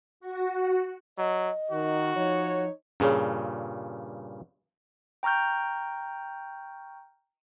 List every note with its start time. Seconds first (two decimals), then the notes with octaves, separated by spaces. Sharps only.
0.20 F#4
1.18 F#3 D#5
1.71 D#3 F#4
2.15 F3 D#4 C#5
3.00 G2 A#2 C#3 C#4 G#4 C#5
5.23 G5 A#5 C#6 F6 G6